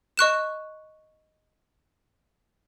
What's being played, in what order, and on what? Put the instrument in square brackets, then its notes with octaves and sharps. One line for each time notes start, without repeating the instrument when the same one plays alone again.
[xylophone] D#5 C#6 F#6 E7